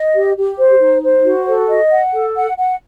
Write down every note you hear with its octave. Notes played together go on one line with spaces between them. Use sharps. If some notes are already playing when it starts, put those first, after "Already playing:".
Already playing: D#5
G4
G4
C5
D#4
C5
F#4
A4
D#5
F#5
A4
F#5
F#5